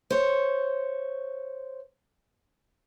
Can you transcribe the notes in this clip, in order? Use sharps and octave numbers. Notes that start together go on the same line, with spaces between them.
C5 C#5